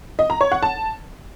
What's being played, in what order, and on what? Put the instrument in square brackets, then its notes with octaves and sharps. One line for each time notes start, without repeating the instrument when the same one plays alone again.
[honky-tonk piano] D#5
A#5
C#5
F#5
A5